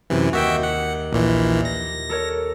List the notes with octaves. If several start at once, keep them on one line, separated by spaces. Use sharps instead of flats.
F#2 C3 E3
D#2 F#4 E5 G5
F#5
A#1 A#2 E3
A#6
A4 A#4 C#5